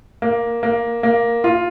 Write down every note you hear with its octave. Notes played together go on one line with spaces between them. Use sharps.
A#3
A#3
A#3
F4